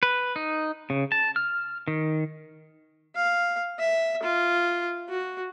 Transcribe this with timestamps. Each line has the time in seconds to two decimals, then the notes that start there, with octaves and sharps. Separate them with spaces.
0.03 B4
0.36 D#4
0.90 C#3
1.12 A5
1.36 F6
1.88 D#3
3.15 F5
3.79 E5
4.23 F4
5.09 F#4